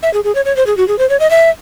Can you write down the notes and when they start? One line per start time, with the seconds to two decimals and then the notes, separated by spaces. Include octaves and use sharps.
0.03 E5
0.14 G#4
0.24 G#4
0.35 C#5
0.45 C#5
0.56 C5
0.67 G#4
0.77 F#4
0.88 G#4
0.99 C5
1.10 C#5
1.20 D#5
1.31 E5